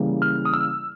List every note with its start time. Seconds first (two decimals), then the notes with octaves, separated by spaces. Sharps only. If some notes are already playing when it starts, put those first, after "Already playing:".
Already playing: C#3 E3 G3 A#3
0.22 F6
0.45 D#6
0.54 E6